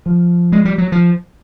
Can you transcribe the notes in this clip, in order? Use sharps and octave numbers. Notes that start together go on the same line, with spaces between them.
F3
G#3
G3
F#3
F3